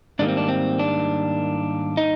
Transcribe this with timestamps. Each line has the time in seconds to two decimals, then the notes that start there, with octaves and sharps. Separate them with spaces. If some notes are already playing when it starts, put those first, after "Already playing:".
0.19 G#2 D#3 G3 A#3 D4
0.28 C4
0.37 D4
0.49 C4
0.79 D4
1.97 D#4